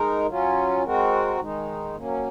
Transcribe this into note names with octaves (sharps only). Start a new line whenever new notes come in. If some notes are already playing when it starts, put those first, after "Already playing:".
Already playing: G#3 D#4 A#4
F#3 C#4 F4
G#3 C4 F#4 A#4
D#3 G#3 D#4
F#3 A#3 C#4